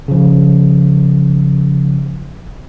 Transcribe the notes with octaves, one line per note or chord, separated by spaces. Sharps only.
C#3 F3